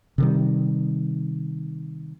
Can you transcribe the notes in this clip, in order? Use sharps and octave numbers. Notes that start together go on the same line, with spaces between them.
C3 D#3 G3